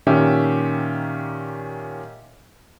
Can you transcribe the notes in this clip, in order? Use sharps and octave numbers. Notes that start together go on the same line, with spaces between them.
A#2 D#3 C#4 G4 E5